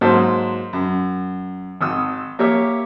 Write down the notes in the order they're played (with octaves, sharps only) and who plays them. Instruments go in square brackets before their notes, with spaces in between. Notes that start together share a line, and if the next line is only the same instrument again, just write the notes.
[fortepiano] G#2 F#3 A#3 C5 A5 D#6
F#2
G#1 D#6 E6
A#3 G4 C#5 E5